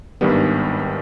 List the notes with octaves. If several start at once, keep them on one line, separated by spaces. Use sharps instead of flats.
G#1 G2 D#3 G3 B3